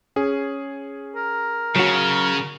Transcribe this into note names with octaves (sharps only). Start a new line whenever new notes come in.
C#4 G#4
A#4
C#3 F#3 F#4